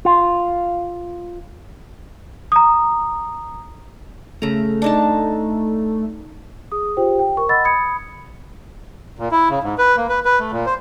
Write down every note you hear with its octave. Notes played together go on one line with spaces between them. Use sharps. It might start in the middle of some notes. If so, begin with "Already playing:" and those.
F4
A#5 D#6
C#3 A3 A#5
D4 D#4 A5
G#4 D#6
F4 G4 C5 G5
G5
A#4 C#6
D#5 F#5 B5 E6 A6
B5 D#6 G#6 C#7
A#2
E4
C#3
G#2
B4
A#3
B4
B4
A3
A#2
C5